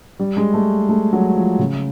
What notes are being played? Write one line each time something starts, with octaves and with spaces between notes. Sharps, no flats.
G3
G#3
A3
A3
F#3
F3
C#3